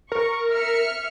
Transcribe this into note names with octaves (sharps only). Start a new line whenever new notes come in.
A#4 C#6
E5 F6 C#7